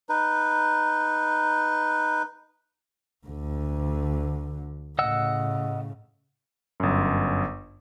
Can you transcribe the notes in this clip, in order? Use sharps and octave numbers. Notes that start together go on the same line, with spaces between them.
D#4 B4
D2 D3
A2 C#3 D#5 F#5 E6
G1 F#2